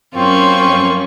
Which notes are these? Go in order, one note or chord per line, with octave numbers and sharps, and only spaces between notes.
F#2 A#3 C4 C#4 F4 C#6